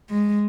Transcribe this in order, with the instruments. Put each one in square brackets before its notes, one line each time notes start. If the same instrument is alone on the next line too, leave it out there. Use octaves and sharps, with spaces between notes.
[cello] G#3